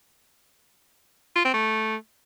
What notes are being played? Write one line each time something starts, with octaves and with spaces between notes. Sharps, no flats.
F4
C4
A3